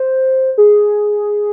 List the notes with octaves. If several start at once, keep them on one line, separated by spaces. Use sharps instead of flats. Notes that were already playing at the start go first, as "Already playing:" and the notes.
Already playing: C5
G#4